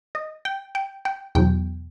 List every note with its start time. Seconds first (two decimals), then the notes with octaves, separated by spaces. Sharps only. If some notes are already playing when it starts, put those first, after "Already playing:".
0.15 D#5
0.45 G5
0.75 G5
1.05 G5
1.35 E2 B2 F#3 G5